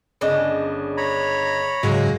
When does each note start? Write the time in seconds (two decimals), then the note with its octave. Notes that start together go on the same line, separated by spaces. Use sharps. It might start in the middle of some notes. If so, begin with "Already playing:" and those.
0.21 G1 C#3 D4 D#5
0.97 C#5 A#5 B5
1.83 G#2 C#3 F#3 G#3 A#3